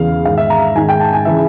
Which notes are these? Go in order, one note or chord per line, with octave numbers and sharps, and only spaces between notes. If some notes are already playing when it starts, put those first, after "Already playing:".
Already playing: E2 C#3 E3 F5
G#2 D#3 F5
E5
A#5
G#2 D#3 G#5
G5
A5
G#5
C#3 E3 E5